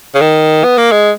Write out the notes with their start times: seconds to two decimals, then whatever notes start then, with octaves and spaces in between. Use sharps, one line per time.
0.15 C#3
0.21 D#3
0.64 B3
0.78 A#3
0.92 G#3